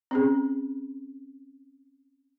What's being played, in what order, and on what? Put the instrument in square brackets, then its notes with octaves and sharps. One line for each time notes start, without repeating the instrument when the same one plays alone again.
[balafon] C4 C#4 G#4